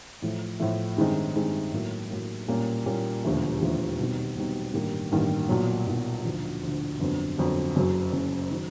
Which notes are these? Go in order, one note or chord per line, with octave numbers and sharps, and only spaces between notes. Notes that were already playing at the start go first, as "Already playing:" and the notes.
A2 F3 A3
A2 F3 A3
G2 D#3 G#3 C4 D#4
G2 D#3 G#3 C4 D#4
A2 F#3 A#3
A2 F#3 A#3
A#2 G3 A#3 C#4
A#2 G3 A#3 C#4
E1 D#2 D3 F3 A3
E1 D#2 D3 F3 A3
B1 B2 G3 C4 D#4
B1 B2 G3 C4 D#4
A1 G2 D#3 G3 A#3
A1 G2 D#3 G3 A#3
B1 A#2 F#3
B1 A#2 F#3
D2 D3 F3
D2 D3 F3
G1 F2 D3 F#3
G1 F2 D3 F#3
F#1 F#2 C#3 F#3
F#1 F#2 C#3 F#3
D#3 F#3